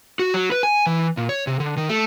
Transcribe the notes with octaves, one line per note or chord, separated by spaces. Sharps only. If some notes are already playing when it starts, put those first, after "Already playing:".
F#4
F#3
B4
G#5
E3
A#2
C#5
C3
D3
D#3
A3